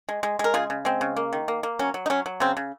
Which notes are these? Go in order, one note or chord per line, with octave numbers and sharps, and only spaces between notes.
G#3
G#3
G#3 A#4
C#3 F4 G#4
C#3
G#3 C4
C#3
A#3
D#3
A#3
A#3
F#3 C#4
F#3
D#4
F#3 C#4
F#3
C#3 C4
C#3